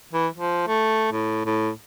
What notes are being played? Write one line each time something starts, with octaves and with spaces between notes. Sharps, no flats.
E3
F3
A3
A2
A2